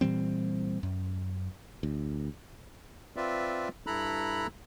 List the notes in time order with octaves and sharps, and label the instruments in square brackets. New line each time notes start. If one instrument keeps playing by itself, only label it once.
[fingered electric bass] A#2 E3 G3 C4
F#2
D2
[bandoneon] C4 F4 B4 D5 E5
G2 E4 A4 A#5 B5 F#6